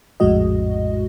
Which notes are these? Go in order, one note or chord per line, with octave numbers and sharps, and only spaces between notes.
A#1 F2 A2 G#3 F#4 D#5